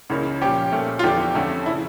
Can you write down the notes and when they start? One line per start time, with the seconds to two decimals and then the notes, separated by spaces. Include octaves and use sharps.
0.10 C#2 C#3 E3 A#3 C#4
0.41 A#2 F3 C#4 G4
0.72 A#2 A3 C#4
0.99 F4
1.03 E2 D3 F3 A3 G4
1.35 F2 D3 A3 C#4
1.66 C#3 F3 E4